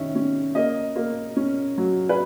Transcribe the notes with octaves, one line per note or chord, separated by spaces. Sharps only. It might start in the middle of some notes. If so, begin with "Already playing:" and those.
Already playing: D#3 C#4 E5
C#4
A#3 D#5
A#3
C#4
F#3
B4